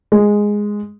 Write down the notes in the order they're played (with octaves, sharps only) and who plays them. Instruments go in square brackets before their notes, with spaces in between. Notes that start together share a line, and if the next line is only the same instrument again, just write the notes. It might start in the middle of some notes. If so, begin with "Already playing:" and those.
[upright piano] G#3